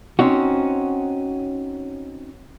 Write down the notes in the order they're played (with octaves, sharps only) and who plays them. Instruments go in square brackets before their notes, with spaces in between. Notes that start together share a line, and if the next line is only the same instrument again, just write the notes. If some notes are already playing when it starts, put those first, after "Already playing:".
[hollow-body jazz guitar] C4 C#4 D#4 F#4